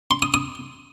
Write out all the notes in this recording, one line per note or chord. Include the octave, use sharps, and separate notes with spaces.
C6
D#6
D#6